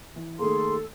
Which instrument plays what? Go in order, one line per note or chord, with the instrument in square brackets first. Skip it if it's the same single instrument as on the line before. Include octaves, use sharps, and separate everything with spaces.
[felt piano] E3
[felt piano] D#3 A3 A#3 [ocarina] G#4 [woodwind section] A4 [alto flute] C6